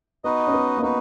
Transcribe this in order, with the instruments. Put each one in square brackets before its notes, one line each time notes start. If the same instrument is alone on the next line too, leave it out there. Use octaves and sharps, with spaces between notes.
[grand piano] B3 [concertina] D#4 F#4 B4 D#5
[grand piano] C#4
B3
A#3
[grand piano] B3 [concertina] D#4 F#4 B4